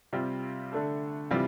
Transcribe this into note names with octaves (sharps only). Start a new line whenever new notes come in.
C3 G3 C4 F4
D3 A3 D4 A4
C3 E3 G3 C4 F4